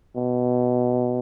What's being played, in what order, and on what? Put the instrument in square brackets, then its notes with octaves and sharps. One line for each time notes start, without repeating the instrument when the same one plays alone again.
[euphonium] B2